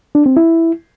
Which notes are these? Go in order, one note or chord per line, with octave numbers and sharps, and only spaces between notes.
D4
C4
E4